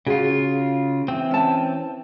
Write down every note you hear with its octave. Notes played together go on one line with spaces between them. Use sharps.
C#3 F4 F#4 G#4
E3 C4
C#4 A5